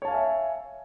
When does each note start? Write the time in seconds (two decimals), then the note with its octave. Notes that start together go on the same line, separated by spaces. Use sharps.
0.02 C#5
0.05 A5
0.08 F5
0.11 G#5
0.14 E5